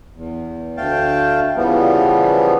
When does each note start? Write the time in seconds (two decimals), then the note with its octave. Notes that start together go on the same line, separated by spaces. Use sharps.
0.16 E2
0.77 D2 A3 F5 G5 A5
1.56 C#3 E3 F3 G3 B3